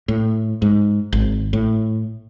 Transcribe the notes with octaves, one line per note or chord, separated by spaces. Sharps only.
A2
G#2
G#1
A2